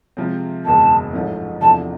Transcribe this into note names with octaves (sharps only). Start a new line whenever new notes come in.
C3 F3 G#3 C4
F#1 E2 B2 G#3 A5
A1 G#2 F3 A3 C#4
E2 C3 F3 A3 D4 A5